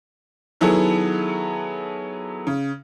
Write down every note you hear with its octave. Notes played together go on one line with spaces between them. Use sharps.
D#3 F#3 B3 E4 G#4 A4
C#3